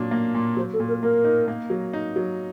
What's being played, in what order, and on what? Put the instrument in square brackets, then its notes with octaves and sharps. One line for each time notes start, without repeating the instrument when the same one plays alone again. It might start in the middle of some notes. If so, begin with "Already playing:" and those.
Already playing: [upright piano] A#2 F#3 D4
A#3
A#2
[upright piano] F#3 [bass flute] C5
[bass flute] A4
[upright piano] A#2
[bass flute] A#4
[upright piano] A#3 [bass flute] A#4
[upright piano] D#4
A#3
F#3
D#4
F#3